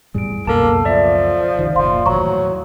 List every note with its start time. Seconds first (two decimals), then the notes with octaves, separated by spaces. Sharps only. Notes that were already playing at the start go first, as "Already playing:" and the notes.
0.14 E2 A2 G3 G#4 D7
0.47 C#2 F#2 B2 A#3 A4 A5
0.85 F3 D5 E5
1.59 C#2 C3 D#3
1.75 F#1 A#2 F3 F5 C6
2.06 D#2 A2 E3 F#3 A#5 C#6